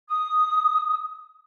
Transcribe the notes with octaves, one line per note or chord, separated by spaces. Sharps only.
D#6